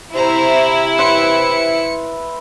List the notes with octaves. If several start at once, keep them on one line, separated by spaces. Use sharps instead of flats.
C3 E4 C5 A#5
B4 E5 C6 C#7